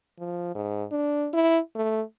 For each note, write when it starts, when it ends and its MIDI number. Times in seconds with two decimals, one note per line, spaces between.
0.19 0.51 53
0.55 0.84 44
0.92 1.28 62
1.33 1.59 64
1.76 2.02 57